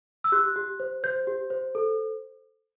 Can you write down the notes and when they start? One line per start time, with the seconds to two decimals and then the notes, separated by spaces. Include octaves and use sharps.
0.24 E6
0.32 G4 F#6
0.56 G4
0.80 C5
1.04 C5 G6
1.27 G4
1.50 C5
1.75 A4